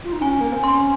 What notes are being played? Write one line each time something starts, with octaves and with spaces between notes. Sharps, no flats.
F4
D#4
C#4 G#5
A#3
C4
C#4 C6